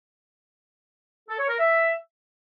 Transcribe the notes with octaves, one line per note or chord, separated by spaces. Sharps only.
A4
C#5
A#4
E5